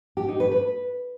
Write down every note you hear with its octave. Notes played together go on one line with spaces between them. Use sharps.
G4
D#4
B4
B4